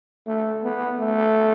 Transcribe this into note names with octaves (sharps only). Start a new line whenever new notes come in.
A3
B3
A3